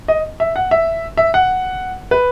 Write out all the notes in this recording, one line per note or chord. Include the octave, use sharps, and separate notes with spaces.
D#5
E5
F#5
E5
E5
F#5
B4